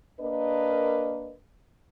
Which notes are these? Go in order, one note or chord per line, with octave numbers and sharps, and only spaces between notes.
A#3 D4 A#4 B4 D#5